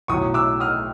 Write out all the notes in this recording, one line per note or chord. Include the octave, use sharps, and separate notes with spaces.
B1 A2 F#3 C#6 D#6
D6 E6
D#6 F6